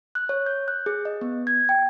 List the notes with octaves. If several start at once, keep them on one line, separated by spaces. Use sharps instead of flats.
F#6
C#5
G6
F#6
G#4
D#5
B3
G#6
G5